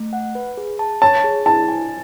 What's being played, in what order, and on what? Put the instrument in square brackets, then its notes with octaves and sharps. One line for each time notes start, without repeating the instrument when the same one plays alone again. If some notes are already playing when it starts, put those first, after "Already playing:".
Already playing: [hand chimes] A3
F#5
B4
G#4
A5
[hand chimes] C#5 [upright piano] A5
[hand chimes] G#4
[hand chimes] E4 [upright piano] A5
[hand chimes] G#5